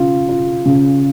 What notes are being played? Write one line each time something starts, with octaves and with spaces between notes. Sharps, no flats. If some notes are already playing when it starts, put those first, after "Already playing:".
Already playing: C#3 F4
F4
C#3